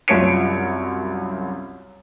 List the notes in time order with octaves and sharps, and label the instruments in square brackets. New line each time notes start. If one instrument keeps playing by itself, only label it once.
[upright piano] C2 F#2 F4 C#5 C#7 D7